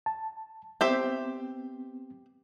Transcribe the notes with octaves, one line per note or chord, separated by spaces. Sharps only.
A5
B3 C4 G4 C5 E5